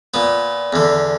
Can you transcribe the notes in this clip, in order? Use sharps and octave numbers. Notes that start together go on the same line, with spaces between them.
A#2 B3
E2 D3